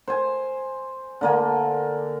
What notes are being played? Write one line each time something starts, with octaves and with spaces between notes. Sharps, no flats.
C5 G#5
D3 A#3 G#5